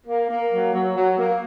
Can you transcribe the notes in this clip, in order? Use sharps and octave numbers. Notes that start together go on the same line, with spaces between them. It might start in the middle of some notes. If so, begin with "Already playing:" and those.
A#3
A#3
F#3
F#3
F#3
A#3